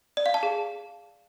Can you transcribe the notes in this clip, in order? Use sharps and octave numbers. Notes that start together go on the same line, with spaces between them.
D5
F5
A5
G#4